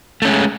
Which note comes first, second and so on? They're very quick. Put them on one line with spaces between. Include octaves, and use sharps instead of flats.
A3 C#4 G#3